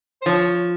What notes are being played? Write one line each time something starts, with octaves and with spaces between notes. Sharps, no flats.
C5
F3 C#5